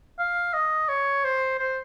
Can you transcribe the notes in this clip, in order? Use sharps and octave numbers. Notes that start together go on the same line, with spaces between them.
F5
D#5
C#5
C5
C5